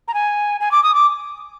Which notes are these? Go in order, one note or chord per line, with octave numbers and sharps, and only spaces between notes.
A#5
G#5
G#5
D6
D#6
D6